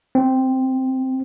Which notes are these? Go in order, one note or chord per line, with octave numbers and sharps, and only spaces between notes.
C4